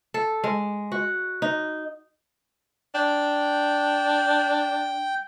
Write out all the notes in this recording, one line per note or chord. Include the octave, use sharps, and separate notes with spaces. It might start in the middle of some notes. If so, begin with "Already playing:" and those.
A4
G#3
F#4
D#4
D4 G5